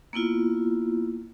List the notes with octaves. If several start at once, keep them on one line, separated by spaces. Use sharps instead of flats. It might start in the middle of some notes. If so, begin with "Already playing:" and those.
A#3 B3 E4 F4